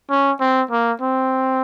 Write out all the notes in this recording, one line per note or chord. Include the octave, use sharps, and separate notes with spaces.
C#4
C4
A#3
C4